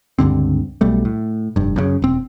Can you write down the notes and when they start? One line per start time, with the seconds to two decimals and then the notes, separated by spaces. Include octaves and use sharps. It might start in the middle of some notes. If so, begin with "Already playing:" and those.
0.19 C#2 G2 D3 C4
0.81 B1 B2 G3 A3
1.05 A2
1.56 F1 G2
1.76 F#2 A#2 C#3
2.02 E1 C4